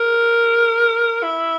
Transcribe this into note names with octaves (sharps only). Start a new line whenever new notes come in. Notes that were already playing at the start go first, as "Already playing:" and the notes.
Already playing: A#4
E4